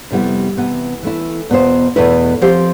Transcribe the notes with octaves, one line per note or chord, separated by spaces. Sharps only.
F2 C3 G3 B3 E4
C3 E3 B3
E3 A3 E4
E2 B2 B3 F4 C5
E2 B2 A3 E4 B4
F3 C4 G4 C5